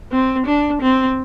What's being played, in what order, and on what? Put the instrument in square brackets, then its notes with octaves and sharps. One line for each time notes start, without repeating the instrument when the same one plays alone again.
[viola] C4
D4
C4